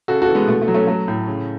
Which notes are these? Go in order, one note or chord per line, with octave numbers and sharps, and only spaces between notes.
C#3 F#4 A4
F#4 A4
E3
G#3 B3
B2 A3
A3
F#3
A3 C#4
F#3 A3
A2
C#3